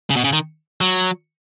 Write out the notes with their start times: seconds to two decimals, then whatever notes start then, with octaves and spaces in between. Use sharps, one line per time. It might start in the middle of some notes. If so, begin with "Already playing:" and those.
0.10 C#3
0.16 B2
0.24 C#3
0.33 D#3
0.81 F#3